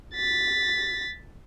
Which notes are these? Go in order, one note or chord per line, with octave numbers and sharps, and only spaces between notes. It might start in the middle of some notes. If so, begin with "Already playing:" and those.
A6 B6